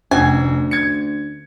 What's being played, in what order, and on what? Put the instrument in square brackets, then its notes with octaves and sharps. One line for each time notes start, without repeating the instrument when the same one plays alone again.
[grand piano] F1 [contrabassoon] D2 [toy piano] C#4 [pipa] G#5
[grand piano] G#6 C#7